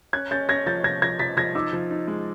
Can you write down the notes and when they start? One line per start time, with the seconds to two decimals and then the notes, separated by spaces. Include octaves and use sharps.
0.13 C#4 F#6 G#6
0.31 C#4 G6 A6
0.49 C#4 G#6 A#6
0.66 F3 G6 A6
0.84 F3 G#6 A#6
1.02 F3 G#6 A#6
1.19 F3 A6 B6
1.37 F3 G#6 A#6
1.55 D#4 D6 E6
1.73 F3
1.91 D#4
2.08 G#3